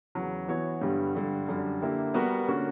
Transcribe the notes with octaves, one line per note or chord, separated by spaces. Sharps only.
E2 C#3 F#3
E3 B3 F#4 C#5
G2 D3 G3 B3
G2 D3 G3
F#2 D3 G3
D3 A#3 E4 G4
G3 B3 F#4 A#4
D3 A#3 C#4 F#4